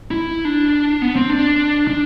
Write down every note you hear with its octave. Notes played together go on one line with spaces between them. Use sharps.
E4
D4
B3
C4
D4
D4